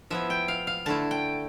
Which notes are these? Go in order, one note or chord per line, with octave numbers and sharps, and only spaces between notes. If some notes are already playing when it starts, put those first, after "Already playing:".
F3 B3 E4 E5
G5
F5
F5
D3 A3 E4 A5
G5